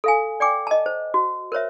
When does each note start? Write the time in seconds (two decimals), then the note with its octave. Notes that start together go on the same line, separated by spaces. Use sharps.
0.04 A4 F5 G#5
0.40 D5 G5 G#5 D6
0.67 D#5 A5
0.86 C5
1.14 F#4
1.52 A#4 C5 C#5 E5